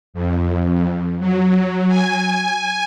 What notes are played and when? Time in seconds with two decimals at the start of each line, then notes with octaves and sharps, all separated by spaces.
0.14 F2
1.20 F#3
1.89 G#5